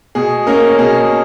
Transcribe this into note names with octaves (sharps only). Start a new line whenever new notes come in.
B2 G#4
A#3 C#4 A#4
B2 G#4